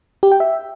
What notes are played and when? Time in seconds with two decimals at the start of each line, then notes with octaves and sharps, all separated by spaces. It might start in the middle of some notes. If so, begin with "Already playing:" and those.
0.23 G4
0.32 G5
0.40 E5